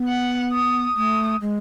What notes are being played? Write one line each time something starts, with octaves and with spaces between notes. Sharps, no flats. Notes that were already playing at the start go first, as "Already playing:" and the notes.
Already playing: B3
F#5
D#6
A3 D#6
G#3